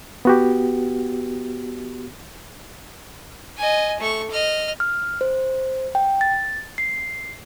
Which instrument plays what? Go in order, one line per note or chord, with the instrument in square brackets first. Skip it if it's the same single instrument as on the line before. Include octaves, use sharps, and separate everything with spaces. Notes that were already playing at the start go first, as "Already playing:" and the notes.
[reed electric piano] B3 F#4 G4
[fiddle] D#5 G#5
A3 C#6
D#5 F6
[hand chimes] F6
C5
G5
A6
C7